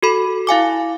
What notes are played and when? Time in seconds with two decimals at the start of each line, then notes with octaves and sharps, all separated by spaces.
0.03 F#4 A4 B5
0.47 E4 F5 G#5 D6